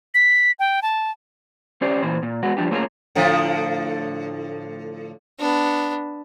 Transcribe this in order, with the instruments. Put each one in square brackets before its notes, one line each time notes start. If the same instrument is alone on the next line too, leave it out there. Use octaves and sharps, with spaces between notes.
[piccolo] B6
G5
A5
[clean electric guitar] C#4 G4 C5 D5
A#2 E3 C5
A#2
G#3 B3 F#4
F3 G3 D4 G4
A3 A#3 C#4 F4 G#4 A#4
[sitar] A2 D3 F3
[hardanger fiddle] B3 D4